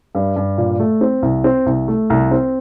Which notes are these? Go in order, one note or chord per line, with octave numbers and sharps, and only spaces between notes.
G2
G2
A#2
A3
C4
C2
C4
C2
A3
C2
C4